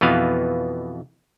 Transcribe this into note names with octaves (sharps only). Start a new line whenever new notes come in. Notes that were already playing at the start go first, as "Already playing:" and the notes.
F2 B2 E3 B3 F5